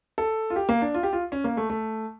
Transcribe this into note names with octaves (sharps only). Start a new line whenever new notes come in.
A4
F4
G4
A#3
D4
F4
G4
F4
C#4
A#3
A3
A3